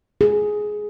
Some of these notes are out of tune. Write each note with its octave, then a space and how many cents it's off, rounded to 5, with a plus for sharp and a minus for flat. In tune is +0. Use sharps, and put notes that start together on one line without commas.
G#4 +10